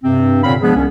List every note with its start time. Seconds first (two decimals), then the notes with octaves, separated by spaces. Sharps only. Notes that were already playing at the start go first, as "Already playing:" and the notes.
0.04 G2 C3 C4
0.44 A#2 D3 C4 C#5 F5 B5
0.62 F3 G#3 B3 D4 G#4
0.76 C2 C#4